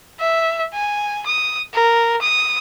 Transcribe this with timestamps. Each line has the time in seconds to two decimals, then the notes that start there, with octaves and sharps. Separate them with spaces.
0.19 E5
0.73 G#5
1.26 D#6
1.74 A#4
2.21 D#6